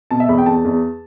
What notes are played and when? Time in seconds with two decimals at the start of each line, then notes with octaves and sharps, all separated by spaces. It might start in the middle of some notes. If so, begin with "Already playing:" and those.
0.11 B2 A5
0.20 E5
0.29 E2 B5
0.38 G5
0.46 E2 A5
0.65 E2